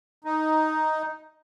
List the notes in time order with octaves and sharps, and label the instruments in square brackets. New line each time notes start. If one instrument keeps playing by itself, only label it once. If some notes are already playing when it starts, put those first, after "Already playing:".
[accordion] D#4